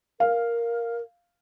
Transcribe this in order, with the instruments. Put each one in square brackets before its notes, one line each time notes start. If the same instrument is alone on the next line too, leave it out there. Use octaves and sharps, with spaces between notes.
[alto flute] A#4 [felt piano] F5